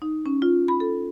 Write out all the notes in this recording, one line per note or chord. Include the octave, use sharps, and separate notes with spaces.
D#4
C#4
F4
B5
A4